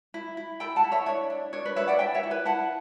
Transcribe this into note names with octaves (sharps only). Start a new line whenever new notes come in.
E4
E4
A4 G5 B5
F#5 A5
E4
C#5 E5
D4 C#5
D4
D4 C#5
B4 D5
B4 C#5 E5
D5 F#5
E4 E5 G5
C#5 E5
E4
B4
E4 F#5 A5